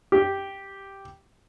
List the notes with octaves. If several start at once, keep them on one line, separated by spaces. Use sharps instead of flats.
G4